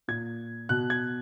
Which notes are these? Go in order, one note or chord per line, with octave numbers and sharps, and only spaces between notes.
A#2 G#6
B2 F#6
G#6